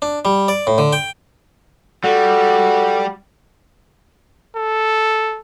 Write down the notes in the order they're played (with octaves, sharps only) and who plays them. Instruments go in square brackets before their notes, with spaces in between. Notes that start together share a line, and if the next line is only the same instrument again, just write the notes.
[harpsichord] D4
G3
D5
A2
D3
G5
[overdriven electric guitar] G3 [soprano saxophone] F#4 [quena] A4
[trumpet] A4